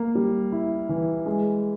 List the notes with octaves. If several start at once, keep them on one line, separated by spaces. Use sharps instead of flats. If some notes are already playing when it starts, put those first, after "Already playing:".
Already playing: A#3
G3
E4
E3
G#3